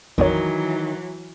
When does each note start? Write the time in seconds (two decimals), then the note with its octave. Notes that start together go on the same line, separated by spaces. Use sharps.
0.18 A#1 F2 D#3 E3 F#3 C#5